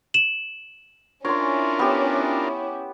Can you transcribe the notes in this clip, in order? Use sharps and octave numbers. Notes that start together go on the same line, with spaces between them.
E7 F#7
C#4 D4 E4 F4 A#4 C#5 C6
B3 G4